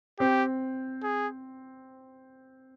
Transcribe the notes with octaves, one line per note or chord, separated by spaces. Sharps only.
C4 G4
G#4